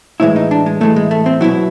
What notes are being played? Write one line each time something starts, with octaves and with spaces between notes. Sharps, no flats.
A2 E3 G#3 E4
D#4
D4
G#3
A2 E3 G#3 A3
G#3
A3
C4
B2 F#3 E4